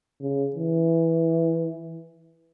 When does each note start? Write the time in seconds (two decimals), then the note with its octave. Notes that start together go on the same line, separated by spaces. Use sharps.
0.21 C#3
0.56 E3